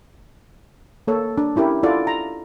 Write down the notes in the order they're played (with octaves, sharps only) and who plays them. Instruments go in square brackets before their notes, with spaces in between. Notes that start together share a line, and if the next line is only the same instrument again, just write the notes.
[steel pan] A#3 A4 C#5
D4
C#4 E4 G4 A#4
E4 F4 A4 D5 F#5
A#5